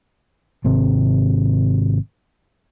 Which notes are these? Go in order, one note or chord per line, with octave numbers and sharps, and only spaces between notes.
G#1 C3 C4